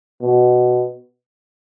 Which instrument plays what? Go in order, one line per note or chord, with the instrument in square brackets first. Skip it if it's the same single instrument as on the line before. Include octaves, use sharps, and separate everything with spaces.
[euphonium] B2